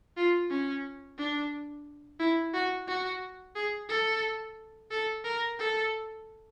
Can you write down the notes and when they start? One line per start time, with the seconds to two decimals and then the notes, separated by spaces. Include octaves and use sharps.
0.17 F4
0.50 C#4
1.18 D4
2.20 E4
2.54 F#4
2.88 F#4
3.55 G#4
3.89 A4
4.91 A4
5.25 A#4
5.60 A4